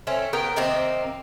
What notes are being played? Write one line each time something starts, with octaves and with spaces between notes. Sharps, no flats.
A3 C4 C#4
B3 A#4 G5
C3 D#3 A#3 C4